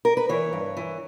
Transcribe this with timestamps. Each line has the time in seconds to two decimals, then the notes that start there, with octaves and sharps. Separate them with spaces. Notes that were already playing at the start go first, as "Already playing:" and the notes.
0.05 A#4
0.17 B4
0.29 E3 C#5
0.53 G2
0.77 E3